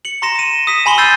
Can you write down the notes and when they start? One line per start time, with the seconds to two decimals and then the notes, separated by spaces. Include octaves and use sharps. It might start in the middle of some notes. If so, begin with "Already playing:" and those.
0.05 C#7 F#7
0.22 A#5 C6 A#6 E7
0.39 D#7 E7
0.67 D#6 B6 E7
0.86 G#5 B5 C6 G7
0.98 E6 G6 A6 C7 D#7